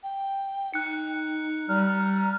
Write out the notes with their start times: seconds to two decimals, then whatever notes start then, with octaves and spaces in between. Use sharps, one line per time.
0.03 G5
0.74 D#4 F#6 C#7
1.68 G3 A#5 F6